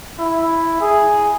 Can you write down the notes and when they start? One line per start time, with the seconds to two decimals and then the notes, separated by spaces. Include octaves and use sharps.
0.18 E4
0.81 G#4